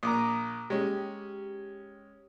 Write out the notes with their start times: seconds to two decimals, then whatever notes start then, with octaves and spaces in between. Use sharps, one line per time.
0.03 A#1 A#5 D6 D#6
0.70 G#3 C#4 G4